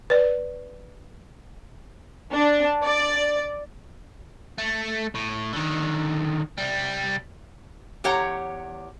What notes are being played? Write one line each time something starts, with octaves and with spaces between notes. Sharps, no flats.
B4 D5
D4
D5
A3
A2
D3 D#3
C2 G3
E2 G4 C#5 F#5 A#5